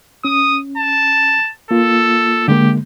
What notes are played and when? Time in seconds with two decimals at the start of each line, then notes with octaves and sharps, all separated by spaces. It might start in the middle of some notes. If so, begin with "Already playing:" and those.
0.25 C#4 D#6
0.77 A5
1.71 A#3 F4 A4
2.48 D3 G#3 A#3 G4